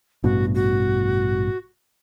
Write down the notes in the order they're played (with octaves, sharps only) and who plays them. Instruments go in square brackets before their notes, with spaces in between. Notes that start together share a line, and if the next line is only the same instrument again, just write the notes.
[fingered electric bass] A1 G2 B2 [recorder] F#4
[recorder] F#4